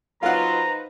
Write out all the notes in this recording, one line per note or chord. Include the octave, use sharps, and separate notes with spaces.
F#3 D#4 F4 B4 C5 F5 F#5 A#5